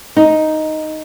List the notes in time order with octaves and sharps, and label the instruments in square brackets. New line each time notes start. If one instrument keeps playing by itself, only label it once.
[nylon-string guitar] D#4